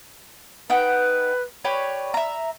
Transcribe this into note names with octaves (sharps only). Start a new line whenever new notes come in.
D#4 B4 F#5 G5
G4 B4 C#5 D5
E5 A#5